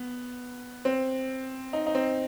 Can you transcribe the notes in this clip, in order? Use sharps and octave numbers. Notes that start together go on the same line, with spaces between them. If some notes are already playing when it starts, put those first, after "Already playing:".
Already playing: B3
C4
D#4
D#4
C4